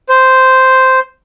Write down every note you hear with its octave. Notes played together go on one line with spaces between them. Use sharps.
C5